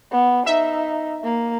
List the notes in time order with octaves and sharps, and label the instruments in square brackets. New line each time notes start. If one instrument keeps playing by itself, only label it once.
[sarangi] B3
[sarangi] D#4 [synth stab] E5
[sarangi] A#3